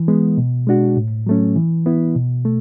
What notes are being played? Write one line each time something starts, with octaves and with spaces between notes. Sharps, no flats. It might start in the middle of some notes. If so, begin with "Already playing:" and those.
Already playing: E3
G#3 B3
B2
G#3 D4 F#4
A2
F#3 A3 C#4
E3
B3 E4
B2
A3